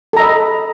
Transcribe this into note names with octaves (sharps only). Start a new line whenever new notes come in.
A4 D#5 A#5 B5